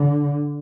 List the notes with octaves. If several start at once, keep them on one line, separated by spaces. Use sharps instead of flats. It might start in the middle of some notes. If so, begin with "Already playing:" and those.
Already playing: D3